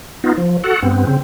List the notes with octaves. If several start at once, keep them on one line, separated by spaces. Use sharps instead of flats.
B3 D#4 F4
F3
F#4 A4 F#5
G2 B3 C4
C#3 C4